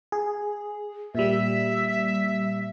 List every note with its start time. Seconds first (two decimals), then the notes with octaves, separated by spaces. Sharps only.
0.12 G#4
1.15 A#2 G3 E5